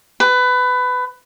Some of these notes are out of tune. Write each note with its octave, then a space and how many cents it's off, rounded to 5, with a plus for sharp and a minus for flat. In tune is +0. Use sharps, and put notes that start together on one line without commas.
B4 +20